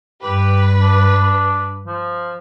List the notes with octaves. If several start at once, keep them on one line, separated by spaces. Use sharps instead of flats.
G2 G4 B4
D4
F3